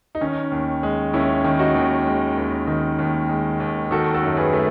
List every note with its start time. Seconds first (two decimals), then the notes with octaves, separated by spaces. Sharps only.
0.15 D#4
0.21 D#3 C#4
0.52 D#2
0.83 G#3
1.13 D#2 C#4 E4
1.44 D#3
1.59 D#4 F#4
1.75 D#2
2.06 G#3
2.38 D#2
2.67 D#3
2.99 D#2
3.29 G#3
3.60 D#2
3.91 D#3 F#4 A4
4.14 F#4 A4
4.23 F#2
4.37 G#4 B4
4.53 A3